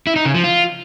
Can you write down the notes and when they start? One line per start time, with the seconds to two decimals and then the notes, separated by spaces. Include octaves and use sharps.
0.07 E4
0.16 D#4
0.25 C#3
0.34 F3
0.44 F4